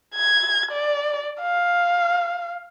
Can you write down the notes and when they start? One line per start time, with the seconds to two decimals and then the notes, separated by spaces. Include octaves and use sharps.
0.15 G#6
0.72 D5
1.41 F5